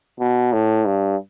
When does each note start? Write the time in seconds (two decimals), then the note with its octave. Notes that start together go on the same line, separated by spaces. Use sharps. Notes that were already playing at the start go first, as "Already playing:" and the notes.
0.20 B2
0.53 A2
0.87 G2